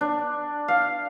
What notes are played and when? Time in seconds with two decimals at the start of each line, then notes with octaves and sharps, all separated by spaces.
0.01 D4
0.68 F5